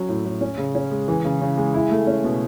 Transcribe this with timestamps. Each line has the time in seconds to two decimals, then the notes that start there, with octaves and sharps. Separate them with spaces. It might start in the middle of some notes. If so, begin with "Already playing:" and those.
Already playing: F#3 C#4
0.09 A2
0.25 A2
0.41 C#4
0.58 C#3
0.75 C#4
0.91 G#3
1.08 E3
1.25 C#3
1.41 C#3
1.57 G#3
1.74 E4
1.91 A3
2.07 C#4
2.24 B2